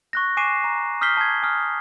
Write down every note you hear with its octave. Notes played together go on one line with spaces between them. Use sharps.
C#6 F#6 A#6
G#5 C#6 D6 C7 D#7 E7
A#5
D#6 F6 G6 B6 C7 G7
A5 G#6
G#5 D#6 F6